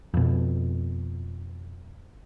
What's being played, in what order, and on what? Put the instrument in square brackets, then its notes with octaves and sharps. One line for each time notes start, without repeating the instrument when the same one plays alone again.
[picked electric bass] F2 B2